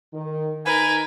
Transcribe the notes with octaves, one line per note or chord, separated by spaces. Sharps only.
D#3
D#4 A#4 B4 G#5